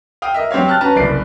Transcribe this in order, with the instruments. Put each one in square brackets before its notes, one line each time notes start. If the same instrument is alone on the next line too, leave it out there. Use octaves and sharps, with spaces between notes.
[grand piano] F5 G5 D#6
A#4 D#5 E5
F#3 C4 G4 C#5 F5
G5 A5 F6 F#6 A6
C#4 F#4 B4 A5 A#5
F#1 C2 D5 C7 D7